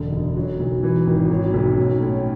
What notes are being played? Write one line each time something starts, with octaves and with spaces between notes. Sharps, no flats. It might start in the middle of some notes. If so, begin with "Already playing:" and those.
Already playing: E1 D3
F#1
F#3
B1
E3
G#1
F#3
B1
C#4
A2